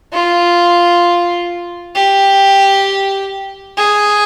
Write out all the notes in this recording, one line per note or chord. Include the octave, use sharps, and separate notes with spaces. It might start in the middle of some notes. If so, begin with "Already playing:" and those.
F4
G4
G#4